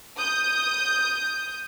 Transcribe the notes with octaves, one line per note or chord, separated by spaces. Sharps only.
D#6 G6